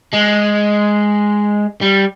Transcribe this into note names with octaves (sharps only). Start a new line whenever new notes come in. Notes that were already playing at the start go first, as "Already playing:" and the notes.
G#3
G3